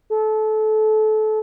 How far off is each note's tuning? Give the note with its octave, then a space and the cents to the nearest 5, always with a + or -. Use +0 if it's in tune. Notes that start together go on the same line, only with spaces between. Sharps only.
A4 -25